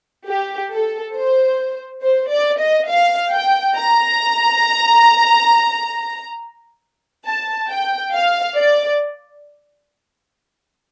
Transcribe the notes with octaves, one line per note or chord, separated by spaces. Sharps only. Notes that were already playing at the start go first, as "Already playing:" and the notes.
G4
A4
C5
C5
D5
D#5
F5
G5
A#5
A5
G5
F5
D5